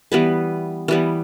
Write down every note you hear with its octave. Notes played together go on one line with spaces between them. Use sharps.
E3 G3 B3 B4
E3 G3 B3